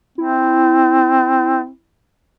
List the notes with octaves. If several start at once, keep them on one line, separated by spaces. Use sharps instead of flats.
C4 E4